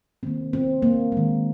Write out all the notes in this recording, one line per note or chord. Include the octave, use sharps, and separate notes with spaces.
D#3 A#3 C4
C4
A#3
D#3 G#3